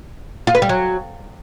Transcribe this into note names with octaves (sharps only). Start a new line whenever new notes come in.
F4
B4
G3
F#3